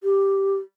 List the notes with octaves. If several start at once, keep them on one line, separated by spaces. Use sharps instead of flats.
G4